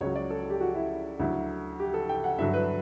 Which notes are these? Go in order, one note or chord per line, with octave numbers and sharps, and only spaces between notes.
C#2 C#3 F#3 C#5
D5
A4
G4
F#4
E4
D2 D3 F#3 E4
G4
A4
G5
F#5
G2 D3 F#3 E5
B4